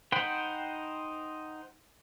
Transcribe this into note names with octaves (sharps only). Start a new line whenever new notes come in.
D#4 C5 F#5 G5 B5